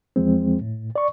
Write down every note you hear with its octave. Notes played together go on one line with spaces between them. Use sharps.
E2 F3 G#3 C4
A2
D5 C#6